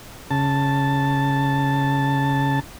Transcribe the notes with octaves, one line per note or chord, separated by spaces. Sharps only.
C#3 A5